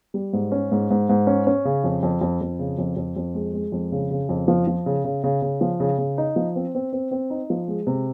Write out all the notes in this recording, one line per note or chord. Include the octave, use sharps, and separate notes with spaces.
G3
G#2
C#4
G#2
G#2
G#2
C#4
C#4
C#3
F2
F2
F2
F2
C#3
F2
F2
F2
G#3
G#3
F2
C#3
C#3
F2
F3
F3
C#3
C#3
C#3
C#3
F3
C#3
C#3
D#4
F3
C4
C4
C4
C4
D#4
F3
G#3
C3